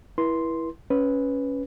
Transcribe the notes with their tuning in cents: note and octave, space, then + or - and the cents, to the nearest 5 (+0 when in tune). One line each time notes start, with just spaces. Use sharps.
E4 +0 B4 -40 C6 +0
C#4 +0 B4 +0